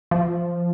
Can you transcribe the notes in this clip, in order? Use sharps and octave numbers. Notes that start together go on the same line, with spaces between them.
F3